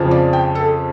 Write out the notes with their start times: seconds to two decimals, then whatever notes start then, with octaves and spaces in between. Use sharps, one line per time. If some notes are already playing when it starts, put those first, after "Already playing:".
Already playing: F2 C#3 F3
0.11 D5
0.33 G5
0.55 A4